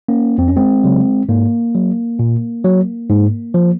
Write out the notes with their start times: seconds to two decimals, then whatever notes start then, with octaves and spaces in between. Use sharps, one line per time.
0.08 A#3 C#4
0.38 F2 C4
0.48 C#4
0.56 G#3 C4
0.84 C#3 F#3
1.29 G#2 A#3
1.75 F#3
2.19 A#2
2.64 F#3
3.10 G#2
3.54 F3